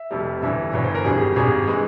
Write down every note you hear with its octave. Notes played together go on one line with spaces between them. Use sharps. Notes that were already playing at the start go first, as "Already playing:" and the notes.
Already playing: E5
F1 F2 C3 G3
G1 G2 E3 E5
G1 G2 E3 C#5
C5
A#4
G#1 G2 G3 G#4
G4
G#1 G2 G3 G#4
E3 G#3